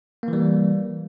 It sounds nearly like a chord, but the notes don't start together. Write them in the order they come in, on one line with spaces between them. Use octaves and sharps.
A#3 E3 G3